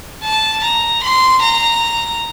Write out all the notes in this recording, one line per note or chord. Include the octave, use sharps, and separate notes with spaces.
A5
A#5
C6
A#5